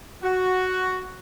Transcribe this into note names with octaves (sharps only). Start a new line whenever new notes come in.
F#4